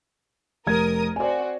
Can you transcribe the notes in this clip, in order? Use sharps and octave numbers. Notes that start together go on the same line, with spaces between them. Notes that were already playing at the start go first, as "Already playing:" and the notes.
F1 A#4 D#6 G#6
C4 F#4 D5 G#5